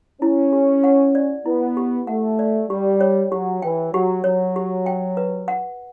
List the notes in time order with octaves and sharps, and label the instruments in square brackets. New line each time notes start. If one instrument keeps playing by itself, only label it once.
[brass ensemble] C#4 [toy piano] E4
[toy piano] G4
F#5
D5
[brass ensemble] B3 [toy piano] E4
[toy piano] G4
[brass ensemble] A3 [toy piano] F#5
[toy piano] D5
[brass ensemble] G3 [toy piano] G4
[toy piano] C#5
[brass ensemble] F#3 [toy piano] G4
[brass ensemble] E3 [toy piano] G5
[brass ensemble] F#3 [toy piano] G4
[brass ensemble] F#3 [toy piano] C#5
[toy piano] G4
G5
B4
F#5